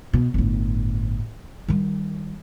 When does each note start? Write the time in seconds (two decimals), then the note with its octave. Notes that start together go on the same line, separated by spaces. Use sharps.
0.13 B2
0.34 G1 A2
1.68 D#3 G3